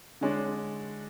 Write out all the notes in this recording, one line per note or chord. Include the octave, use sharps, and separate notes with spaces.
D3 G#3 D4 C#5